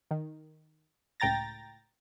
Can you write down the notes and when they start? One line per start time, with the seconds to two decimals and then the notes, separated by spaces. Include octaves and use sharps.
0.11 D#3
1.20 C#2 A2 G5 A#5 A6 A#6